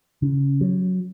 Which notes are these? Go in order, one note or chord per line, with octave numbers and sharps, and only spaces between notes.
C#3
F#3